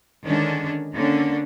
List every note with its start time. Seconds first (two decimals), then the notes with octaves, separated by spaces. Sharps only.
0.25 D3 D#3 G#3 C#4 D4
0.92 D3 A#3 C#4 D4